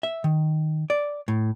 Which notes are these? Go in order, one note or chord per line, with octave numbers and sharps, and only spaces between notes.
E5
D#3
D5
A2